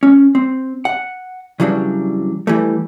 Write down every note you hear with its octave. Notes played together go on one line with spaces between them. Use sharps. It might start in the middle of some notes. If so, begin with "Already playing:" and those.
C#4
C4
F#5
C#3 E3 F#3 G3 D4
E3 G3 A3